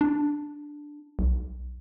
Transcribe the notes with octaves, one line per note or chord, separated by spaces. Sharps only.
D4
B1